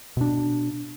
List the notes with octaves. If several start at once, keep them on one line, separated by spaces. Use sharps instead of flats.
B2 D4